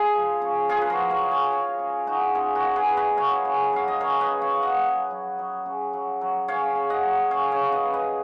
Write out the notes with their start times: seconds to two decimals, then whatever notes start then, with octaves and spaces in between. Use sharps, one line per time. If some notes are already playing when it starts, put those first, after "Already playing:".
Already playing: G#3 F4 G#4
0.14 F3
0.42 C#3
0.69 F3 F4 G#4
0.82 B4
0.90 F#4 A#4
0.97 F3
1.10 A#4 C#5
1.25 G#3
1.31 C#5 F5
1.52 C#3 C#5 F5
1.79 C#3
2.07 G#3 D#4 F#4
2.35 C#3 F4 G#4
2.55 F#4 A#4
2.63 G#3
2.76 G#4 B4
2.90 G#3
2.97 B4 D#5
3.17 F#3 C#5 F5
3.45 C#3
3.73 F#3 F5
3.88 D#5
4.00 C#3 A#4 C#5
4.21 B4 D#5
4.27 C#3
4.42 C#5 F5
4.56 F#3
4.62 D#5 F#5
4.83 C#3
5.11 F#3
5.39 F#3
5.66 C#3
5.93 F#3
6.21 F#3
6.48 C#3 C#5 F5
6.76 C#3
6.90 D#5 F#5
7.04 F#3
7.31 C#3 C#5 F5
7.52 C#5 F5
7.59 F#3
7.72 B4 D#5
7.86 C#3
7.93 B4 D#5